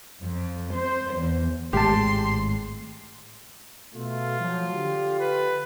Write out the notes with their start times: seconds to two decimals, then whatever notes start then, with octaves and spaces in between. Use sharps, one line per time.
0.22 F2
0.74 C5
1.15 E2
1.73 G#1 A2 G#3 G4 A5 C6
3.95 B2 A3 F4
4.39 F3 F#3
4.73 D3 G4
5.20 B4